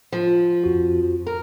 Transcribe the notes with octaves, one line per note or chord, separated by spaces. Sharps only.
F3
F2 F#4
A#4